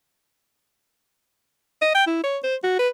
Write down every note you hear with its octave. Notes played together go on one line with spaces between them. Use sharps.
D#5
G5
E4
C#5
C5
F#4
B4